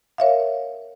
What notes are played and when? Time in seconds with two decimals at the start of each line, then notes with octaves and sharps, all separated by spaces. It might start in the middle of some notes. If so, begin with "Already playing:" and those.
0.18 A#4 C#5 E5 F5